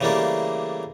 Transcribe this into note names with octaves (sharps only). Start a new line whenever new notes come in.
C#3 E3 G3 A3 A#3 D4